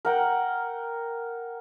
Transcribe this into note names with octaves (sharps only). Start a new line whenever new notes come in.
A#4 F#5 G5